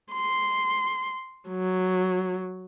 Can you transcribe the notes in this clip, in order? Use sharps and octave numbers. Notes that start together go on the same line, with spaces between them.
C6
F#3